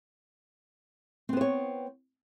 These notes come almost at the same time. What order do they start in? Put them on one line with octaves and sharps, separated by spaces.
C4 B3 C5 C#5